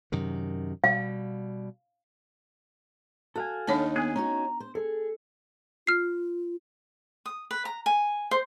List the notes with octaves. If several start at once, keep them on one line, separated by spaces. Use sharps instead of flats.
F#2 C3 D#3
B2 G3 F5
F#4 A4 F5 G#5
D#2 D4 D#4 C#5 F#5 A5
B3 G#4 F#6
C#4 D#4 F#4 A#5
C5
G#4 A4
F4 F6 C7
D#6
B4
A#5
G#5
C5